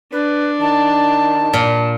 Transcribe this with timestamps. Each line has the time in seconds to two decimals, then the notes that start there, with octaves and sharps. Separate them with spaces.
0.12 D4 B4
0.61 D#3 A5
1.54 A#2